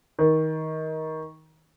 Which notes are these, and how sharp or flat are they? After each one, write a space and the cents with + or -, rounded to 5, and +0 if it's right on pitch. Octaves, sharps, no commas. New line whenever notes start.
D#3 +20